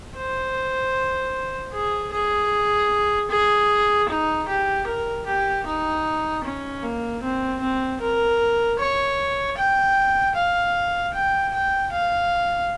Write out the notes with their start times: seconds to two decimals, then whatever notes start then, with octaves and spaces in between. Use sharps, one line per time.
0.17 C5
1.73 G#4
2.13 G#4
3.31 G#4
4.08 D#4
4.48 G4
4.87 A#4
5.26 G4
5.65 D#4
6.44 C#4
6.83 A#3
7.22 C4
7.61 C4
8.01 A#4
8.79 C#5
9.57 G5
10.35 F5
11.14 G5
11.53 G5
11.92 F5